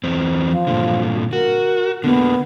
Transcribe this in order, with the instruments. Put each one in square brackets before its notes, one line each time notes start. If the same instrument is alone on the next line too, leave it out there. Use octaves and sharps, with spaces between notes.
[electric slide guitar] E2 C4
[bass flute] F3
[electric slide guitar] G2 A#2 D3
[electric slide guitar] F#4 [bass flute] A#4
[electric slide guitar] D3 A#3 [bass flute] B3